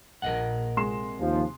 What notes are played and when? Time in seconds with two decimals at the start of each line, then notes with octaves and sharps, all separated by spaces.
0.22 A#1 A#2 A#4 D#5 F#5
0.77 C3 G#3 C6 E7
1.20 D#2 F3